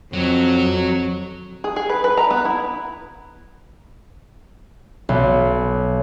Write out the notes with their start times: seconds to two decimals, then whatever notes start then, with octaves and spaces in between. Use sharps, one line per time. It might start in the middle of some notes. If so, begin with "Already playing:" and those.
0.13 F2 F#3
1.64 G#4
1.76 G#4
1.89 B4
2.04 B4
2.17 A#5
2.31 B3
2.45 E4
5.09 B1